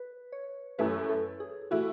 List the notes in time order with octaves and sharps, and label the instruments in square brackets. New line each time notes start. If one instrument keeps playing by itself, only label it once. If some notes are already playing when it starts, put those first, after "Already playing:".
Already playing: [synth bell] B4
C#5
[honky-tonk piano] F#2 E3 A3 E4 [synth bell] B4
[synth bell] A4
G#4
[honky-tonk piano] E3 A3 E4 [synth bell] F#4